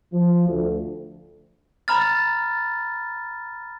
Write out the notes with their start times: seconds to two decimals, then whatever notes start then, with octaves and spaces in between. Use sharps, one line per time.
0.12 F3
0.48 D2
1.88 A#5 B5 F6 A6